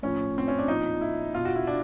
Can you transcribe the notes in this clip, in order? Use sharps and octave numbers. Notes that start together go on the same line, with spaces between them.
A2 F3 C#4
C4
C#4
D4
A#2 F3 D#4
E4
B2 F4
F#4
E4
D4